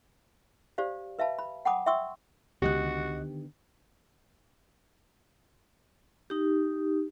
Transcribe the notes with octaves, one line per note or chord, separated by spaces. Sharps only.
G4 C5 D5 F5
B4 E5 F5 A5 B5
B5
F#5 G5 A5 B5 D6 D#6
E5 G5 C6 C#6 E6
C#2 D3 D#3 B3 F#4 G4 D#5 F#6
D#4 G4